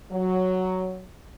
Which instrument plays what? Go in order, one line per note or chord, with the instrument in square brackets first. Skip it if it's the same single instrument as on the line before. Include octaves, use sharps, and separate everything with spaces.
[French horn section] F#3